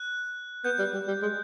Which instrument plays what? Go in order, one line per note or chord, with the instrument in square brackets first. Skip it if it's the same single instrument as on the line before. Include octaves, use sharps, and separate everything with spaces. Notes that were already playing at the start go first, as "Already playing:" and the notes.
Already playing: [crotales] F#6
[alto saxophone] B3 [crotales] G6
[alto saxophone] G3
G3
G3
G#3